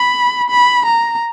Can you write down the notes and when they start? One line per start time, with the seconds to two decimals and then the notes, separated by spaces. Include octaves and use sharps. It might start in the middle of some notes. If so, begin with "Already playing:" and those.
Already playing: B5
0.49 B5
0.86 A#5